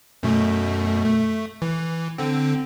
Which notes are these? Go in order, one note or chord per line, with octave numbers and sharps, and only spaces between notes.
F#2 B2 A3
A3
E3
D3 C4